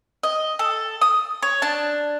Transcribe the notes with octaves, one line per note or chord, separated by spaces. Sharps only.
D#5
A4
D#6
C#5
D4 A5